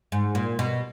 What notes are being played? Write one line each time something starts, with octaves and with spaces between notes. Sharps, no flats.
G#2
A#2
B2